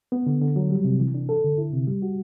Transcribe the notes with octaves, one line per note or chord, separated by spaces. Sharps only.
B3
D3
D3
F#3
G3
C3
E3
D4
A4
D3
E4
C3
G3
F#4